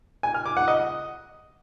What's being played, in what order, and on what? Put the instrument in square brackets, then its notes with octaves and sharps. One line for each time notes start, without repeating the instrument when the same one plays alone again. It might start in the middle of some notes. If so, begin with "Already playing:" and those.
[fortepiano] G#5
F6
D6
F#5
D#5